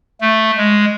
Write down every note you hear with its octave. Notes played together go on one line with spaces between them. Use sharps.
A3
G#3